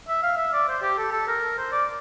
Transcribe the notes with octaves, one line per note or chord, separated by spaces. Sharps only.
E5
F5
E5
D5
C5
G4
A4
A4
A#4
C5
D5